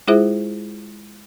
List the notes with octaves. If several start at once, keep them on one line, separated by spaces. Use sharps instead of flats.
G#3 E4 F4 G#4 C5 E5